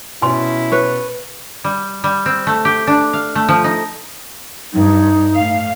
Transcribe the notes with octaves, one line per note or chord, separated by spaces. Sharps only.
B2 C#4 E4 G#5 C6
B4 C#5
G3
G3
C4
A3
G4
D4
F5
A3
F3
D#4
G2 D#4
A2 F5